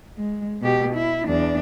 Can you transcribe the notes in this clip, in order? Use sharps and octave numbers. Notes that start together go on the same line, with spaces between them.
G#3
B2 G4
E4
E2 D4